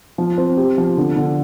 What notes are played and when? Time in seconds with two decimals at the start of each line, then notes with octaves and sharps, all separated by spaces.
0.18 F3
0.38 C4
0.57 G4
0.78 F3
0.97 D3
1.16 D3